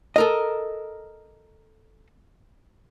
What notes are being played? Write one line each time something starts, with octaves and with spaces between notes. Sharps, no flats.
A4 A#4 D#5